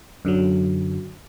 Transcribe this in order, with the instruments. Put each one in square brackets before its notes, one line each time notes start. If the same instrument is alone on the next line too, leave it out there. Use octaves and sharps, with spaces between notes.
[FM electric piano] F#2 D3 F#3